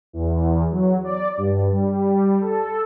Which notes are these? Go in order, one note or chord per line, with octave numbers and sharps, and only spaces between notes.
E2
F#3
D5
G2
G3
A4